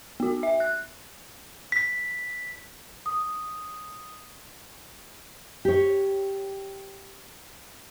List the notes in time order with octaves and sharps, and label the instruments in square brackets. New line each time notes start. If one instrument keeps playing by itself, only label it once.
[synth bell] B3 F#4
E5
F#6
[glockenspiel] B6
[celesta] D#6
[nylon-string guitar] G4 C#5